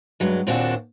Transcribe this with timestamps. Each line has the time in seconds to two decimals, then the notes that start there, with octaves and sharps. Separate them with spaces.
0.20 G2 F#3 G#3
0.47 D#2 A#2 C4 D4 F#4 F#5